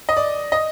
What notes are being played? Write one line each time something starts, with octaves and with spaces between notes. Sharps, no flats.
D#5
D5
D#5